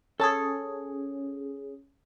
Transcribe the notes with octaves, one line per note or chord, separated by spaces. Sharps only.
C#4 G#4 A4 A5